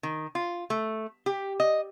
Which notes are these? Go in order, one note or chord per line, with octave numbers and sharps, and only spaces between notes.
D#3
F4
A3
G4
D#5